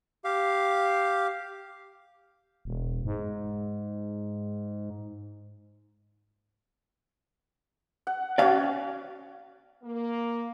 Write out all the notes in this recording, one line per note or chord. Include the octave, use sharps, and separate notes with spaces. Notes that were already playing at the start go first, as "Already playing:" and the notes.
G4 F5
E1
G#2
F#5
C#4 F#4 D5 F5
A#3